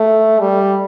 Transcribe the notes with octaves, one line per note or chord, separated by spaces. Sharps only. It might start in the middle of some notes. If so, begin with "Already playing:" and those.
Already playing: A3
G3